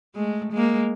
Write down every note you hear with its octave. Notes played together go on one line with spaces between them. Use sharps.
G#3 A3
G#3 A#3